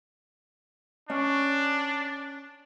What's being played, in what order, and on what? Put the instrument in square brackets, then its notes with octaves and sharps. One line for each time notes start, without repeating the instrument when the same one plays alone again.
[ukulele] C#4 [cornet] D4